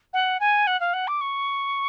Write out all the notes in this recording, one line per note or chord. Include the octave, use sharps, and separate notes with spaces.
F#5
G#5
F#5
F5
F#5
D6
C#6